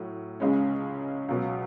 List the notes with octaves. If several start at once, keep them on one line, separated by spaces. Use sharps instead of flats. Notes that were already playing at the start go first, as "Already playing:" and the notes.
Already playing: A2 F#3
C#2 C#3 G#3 C#4
C#2 B2 F#3